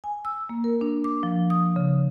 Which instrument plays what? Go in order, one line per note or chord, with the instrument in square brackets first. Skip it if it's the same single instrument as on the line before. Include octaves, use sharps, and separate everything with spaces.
[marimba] G#5
E6
A#3
A#4
D4
D6
F3
D#6
C#3